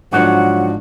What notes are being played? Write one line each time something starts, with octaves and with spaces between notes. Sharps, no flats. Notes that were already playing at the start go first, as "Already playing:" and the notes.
G#2 D3 F3 F#3 D4 F#4 F#5